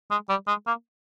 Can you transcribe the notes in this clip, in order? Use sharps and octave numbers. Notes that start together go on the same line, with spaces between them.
G#3
G3
G#3
A#3